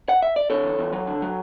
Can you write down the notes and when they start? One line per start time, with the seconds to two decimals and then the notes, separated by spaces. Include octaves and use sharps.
0.09 F#5
0.22 E5
0.36 D5
0.50 D3 A4 C#5
0.64 E2
0.79 E2
0.93 F#3
1.07 D3
1.22 F#3